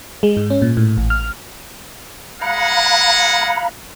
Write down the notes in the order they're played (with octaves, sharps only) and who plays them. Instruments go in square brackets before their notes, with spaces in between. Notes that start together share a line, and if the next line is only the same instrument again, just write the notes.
[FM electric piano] G#3
G#2
C#4
A#2
A2
A1
F6
[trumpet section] G#3 F#5 [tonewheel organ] F5 A#5 B5